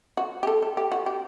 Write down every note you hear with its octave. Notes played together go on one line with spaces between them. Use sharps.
F#4
G4
A4
A4
G4
F#4
G4